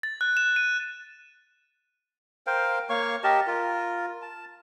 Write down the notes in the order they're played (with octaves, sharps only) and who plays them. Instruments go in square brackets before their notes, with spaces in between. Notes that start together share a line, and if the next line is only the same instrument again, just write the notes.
[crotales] A6
F#6
E7
D#7
[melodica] A#4 C5 F5 G5
A#3 C#5 F5 C#6
G4 A#4 D#5 A5
F4 A#4
A5